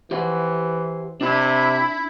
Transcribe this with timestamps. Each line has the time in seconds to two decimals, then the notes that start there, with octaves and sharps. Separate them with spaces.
0.11 E3 G4 C5 F#5
1.21 C3 D4 E4